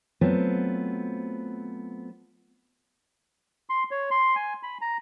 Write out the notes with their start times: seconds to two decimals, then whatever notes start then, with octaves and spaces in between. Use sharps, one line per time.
0.21 F#3 A3 B3 C4 F4
3.69 C6
3.91 C#5
4.11 C6
4.36 G#5
4.63 B5
4.81 A#5